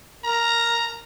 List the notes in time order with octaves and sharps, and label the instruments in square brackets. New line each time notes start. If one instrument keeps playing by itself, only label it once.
[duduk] A#4 [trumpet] A#5